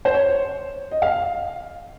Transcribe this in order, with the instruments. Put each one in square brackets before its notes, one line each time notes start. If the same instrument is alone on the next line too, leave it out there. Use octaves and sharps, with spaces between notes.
[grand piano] C5
C#5
D#5
F5